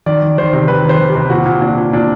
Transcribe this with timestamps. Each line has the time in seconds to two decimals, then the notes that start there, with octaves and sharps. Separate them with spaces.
0.06 D#3 D5
0.22 D#3
0.38 D#3 C5
0.53 C3
0.68 D#3 B4
0.85 D#3 C5
0.99 D#3
1.09 G4
1.15 C3
1.30 A#2 F#4
1.46 A#2
1.61 A#2 D4
1.77 A#2
1.93 A#2 D4